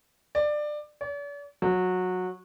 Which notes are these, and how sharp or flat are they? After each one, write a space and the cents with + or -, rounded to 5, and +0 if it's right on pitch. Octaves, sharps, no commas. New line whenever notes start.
D5 +20
D5 -45
F#3 -15